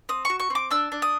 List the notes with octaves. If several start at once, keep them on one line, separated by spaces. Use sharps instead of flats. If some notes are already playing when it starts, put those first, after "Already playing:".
C4 D#6
F#4 C#6
C#6
C4 D6
D4 E6
D4
D#6